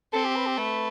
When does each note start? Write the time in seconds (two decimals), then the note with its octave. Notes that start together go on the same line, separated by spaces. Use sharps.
0.13 C4 A4
0.25 G4
0.36 B4
0.47 G4
0.57 A3 B4